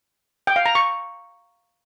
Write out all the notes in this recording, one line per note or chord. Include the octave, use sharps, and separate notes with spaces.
G5
F5
A#5
C#6